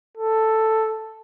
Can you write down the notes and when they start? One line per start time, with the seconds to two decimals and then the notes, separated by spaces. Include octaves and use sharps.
0.17 A4